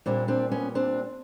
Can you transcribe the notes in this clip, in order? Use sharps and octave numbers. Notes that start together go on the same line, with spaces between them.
A#2 G3 A#3 C4 D4
C4 D4
B3 C#4
C4 D4